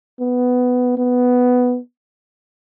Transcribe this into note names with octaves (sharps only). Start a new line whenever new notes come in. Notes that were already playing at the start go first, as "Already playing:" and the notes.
B3
B3